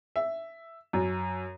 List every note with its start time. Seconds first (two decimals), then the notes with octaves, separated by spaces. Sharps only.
0.16 E5
0.93 F#2